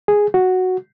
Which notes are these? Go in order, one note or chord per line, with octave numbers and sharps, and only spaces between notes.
G#4
F#4